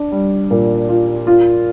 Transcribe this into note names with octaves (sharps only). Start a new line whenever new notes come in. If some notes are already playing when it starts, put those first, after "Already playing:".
Already playing: D4
G3
A#2
F4
F4